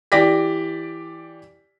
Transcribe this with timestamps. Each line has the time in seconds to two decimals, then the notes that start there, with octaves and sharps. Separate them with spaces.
0.12 E3 G4 D5 D6 A#6 B6